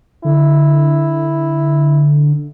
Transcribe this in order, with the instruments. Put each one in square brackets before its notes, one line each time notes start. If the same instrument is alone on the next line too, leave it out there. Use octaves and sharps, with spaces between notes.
[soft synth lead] D3 [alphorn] E4